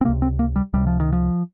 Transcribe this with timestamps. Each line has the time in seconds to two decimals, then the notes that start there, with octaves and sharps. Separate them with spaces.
0.01 C4
0.05 C3 A#3
0.09 C#2
0.22 C4
0.39 A#3
0.56 G3
0.73 C#2 C3 G3
0.87 F3
1.00 D#3
1.13 F3